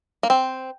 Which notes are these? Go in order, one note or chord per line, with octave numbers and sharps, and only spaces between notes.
A#3
C4